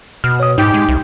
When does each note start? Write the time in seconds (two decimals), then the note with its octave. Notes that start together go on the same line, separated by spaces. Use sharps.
0.24 B2 F6
0.40 C#5 D#6
0.58 G#2 D#4 G4
0.74 G#3
0.88 C2